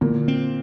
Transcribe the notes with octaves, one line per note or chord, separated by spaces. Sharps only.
A#2 D3
C4